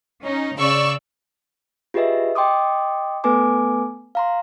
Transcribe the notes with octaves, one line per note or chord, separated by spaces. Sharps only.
C#4 D#4
C#3 D5 C#6 E6
F4 G4 G#4 B4 D#5 E5
D#5 G5 C6 D6 D#6
A3 B3 A4 B4 G#5 D6
F5 A#5 C6